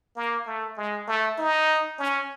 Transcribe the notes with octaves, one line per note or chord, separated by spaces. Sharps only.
A#3
A3
G#3
A3
D#4
C#4